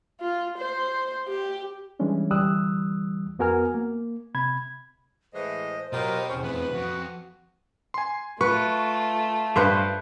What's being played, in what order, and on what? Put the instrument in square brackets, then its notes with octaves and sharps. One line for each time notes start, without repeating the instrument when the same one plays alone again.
[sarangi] F4
C5
G4
[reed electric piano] E3 G3 G#3 C#4 D4
D2 E3 G3 D#6 E6 F#6
F2 B3 F#4 A#4 G#5 F6
A#3
C3 B5 G#6
[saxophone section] A2 E3 G#3 [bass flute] C5 [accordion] D#5
[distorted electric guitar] B2 [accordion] F#3 A#4 [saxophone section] F4 G4 D#5
[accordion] E2 [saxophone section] C4 C#4
[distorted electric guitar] F2 C3 [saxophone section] B3 B4
[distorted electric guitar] F2 [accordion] F#4
[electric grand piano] G#5 C6
[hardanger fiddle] A3 F4 [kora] B4 [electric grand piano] C#6
[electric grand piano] G2 [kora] B4 C5 F5